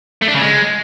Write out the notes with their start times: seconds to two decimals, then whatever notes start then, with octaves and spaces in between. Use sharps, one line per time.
0.22 A3
0.28 D4
0.35 C#3
0.41 G#3